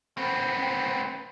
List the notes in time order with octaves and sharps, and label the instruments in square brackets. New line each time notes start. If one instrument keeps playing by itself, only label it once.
[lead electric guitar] B3 C4